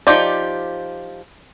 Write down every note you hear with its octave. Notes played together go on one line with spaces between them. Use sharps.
F3 D#4 F4 G4 D5